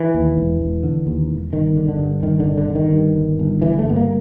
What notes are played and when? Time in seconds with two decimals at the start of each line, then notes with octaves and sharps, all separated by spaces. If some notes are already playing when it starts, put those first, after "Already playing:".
Already playing: E3
0.15 D#2
0.38 E1
0.61 E1
0.83 D3
1.07 D#2
1.31 E1
1.53 G1 D#3
1.77 D3
1.88 D3
1.99 G2
2.23 G1 D#3
2.40 D3
2.46 G1
2.58 D3
2.70 D3
2.75 D#3
2.93 G2
3.16 G1
3.39 G1
3.62 D3 E3
3.79 A3
3.85 G2 B3
3.96 A#3